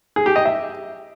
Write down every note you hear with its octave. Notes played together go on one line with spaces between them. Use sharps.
G#4
G4
D#5
E5